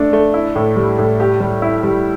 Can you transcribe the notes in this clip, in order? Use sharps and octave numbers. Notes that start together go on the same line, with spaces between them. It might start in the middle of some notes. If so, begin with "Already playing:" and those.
Already playing: A3 D4 A4
A3
E4
A2
G3
A2
G4
G3
E4
G3